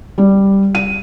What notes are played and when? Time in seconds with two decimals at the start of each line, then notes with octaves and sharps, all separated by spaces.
0.18 G3
0.75 D#7